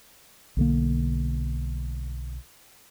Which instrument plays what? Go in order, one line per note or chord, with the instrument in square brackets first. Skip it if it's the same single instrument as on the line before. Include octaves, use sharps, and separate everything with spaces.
[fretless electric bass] B1 D3 A#3